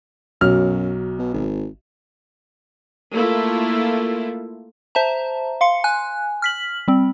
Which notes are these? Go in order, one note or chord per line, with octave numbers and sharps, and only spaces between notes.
B1 F#2 F#3 F6
B2
G#1
A3 A#3 E4 F4
C5 E5 A5 A#5
F5 C6 C#7
G#5 F#6
F6 B6 F#7
G3 C4